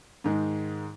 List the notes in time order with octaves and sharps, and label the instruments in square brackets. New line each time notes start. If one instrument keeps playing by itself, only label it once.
[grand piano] G#2 D#3 G#3